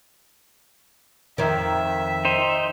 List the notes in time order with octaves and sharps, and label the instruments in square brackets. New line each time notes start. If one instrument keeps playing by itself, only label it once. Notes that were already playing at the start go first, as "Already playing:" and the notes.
[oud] F2 D#3 [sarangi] E5
[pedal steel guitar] D#4 C5